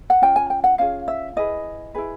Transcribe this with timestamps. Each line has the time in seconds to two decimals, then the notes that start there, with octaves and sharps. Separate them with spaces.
0.10 F#5
0.22 C#4 F4 G5
0.36 G#5
0.50 G5
0.64 F#5
0.78 C#4 F4 G#4 F5
1.08 E5
1.36 E4 G#4 B4 D#5
1.94 E4 G#4 B4